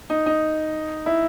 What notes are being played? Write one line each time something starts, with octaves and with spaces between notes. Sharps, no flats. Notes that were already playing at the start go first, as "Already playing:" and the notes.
D#4
D#4
E4